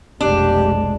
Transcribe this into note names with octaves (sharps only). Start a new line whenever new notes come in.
F1 B1 G#3 D4 G4